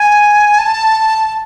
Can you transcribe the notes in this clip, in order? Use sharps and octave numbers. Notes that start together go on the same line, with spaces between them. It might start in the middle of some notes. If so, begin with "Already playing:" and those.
Already playing: G#5
A5